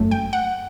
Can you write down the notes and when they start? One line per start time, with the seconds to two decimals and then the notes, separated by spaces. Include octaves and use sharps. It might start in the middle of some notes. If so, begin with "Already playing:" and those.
Already playing: G1 F#2 F#3 A3
0.11 G5
0.33 F#5